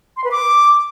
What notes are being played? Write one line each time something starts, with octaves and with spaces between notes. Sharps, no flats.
C6
B4
D6